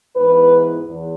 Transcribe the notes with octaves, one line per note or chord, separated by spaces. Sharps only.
G#2 E3 B3 B4
E2